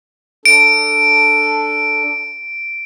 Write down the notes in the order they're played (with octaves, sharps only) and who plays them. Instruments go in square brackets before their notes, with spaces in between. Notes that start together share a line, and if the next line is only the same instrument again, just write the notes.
[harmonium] D4 A4 [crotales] D7